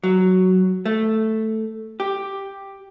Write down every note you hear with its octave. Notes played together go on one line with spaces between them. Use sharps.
F#3
A3
G4